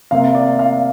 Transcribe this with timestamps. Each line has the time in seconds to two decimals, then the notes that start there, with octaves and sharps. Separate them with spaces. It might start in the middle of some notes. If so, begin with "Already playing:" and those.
0.11 C3 A#3 F5
0.35 D5
0.59 F5